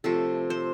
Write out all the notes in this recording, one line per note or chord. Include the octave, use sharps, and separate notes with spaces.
C3 F3 A3 A4
C5